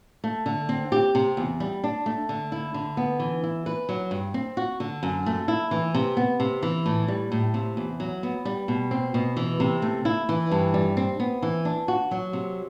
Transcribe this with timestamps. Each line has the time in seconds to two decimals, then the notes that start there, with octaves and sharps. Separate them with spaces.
0.24 A3
0.46 D3
0.69 C4
0.92 G4
1.15 C3
1.37 E2
1.60 G3
1.84 D4
2.06 A3
2.29 D3
2.52 E4
2.74 D3
2.97 B3
3.20 E3
3.43 E4
3.66 B4
3.89 F#3
4.11 G2
4.34 C4
4.57 F#4
4.80 D3
5.03 F#2
5.26 A3
5.48 E4
5.71 E3
5.94 C3
6.17 B3
6.40 C3
6.62 E3
6.86 A2
7.08 G3
7.32 A2
7.54 C3
7.77 E2
8.00 F#3
8.23 B3
8.45 G3
8.68 B2
8.91 C4
9.14 B2
9.37 E3
9.60 C3
9.82 A3
10.05 E4
10.29 E3
10.51 G2
10.74 G3
10.97 C4
11.20 B3
11.42 E3
11.65 D4
11.88 F#4
12.11 F#3
12.33 C3